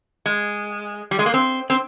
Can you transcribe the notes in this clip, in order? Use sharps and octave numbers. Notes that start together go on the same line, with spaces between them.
G#3
G3
G#3
A#3
C4
C4